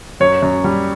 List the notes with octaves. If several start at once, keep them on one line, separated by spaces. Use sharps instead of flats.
F#2 C#5
F#2
G3